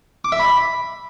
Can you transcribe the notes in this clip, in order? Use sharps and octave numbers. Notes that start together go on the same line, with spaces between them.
D6
E5
B5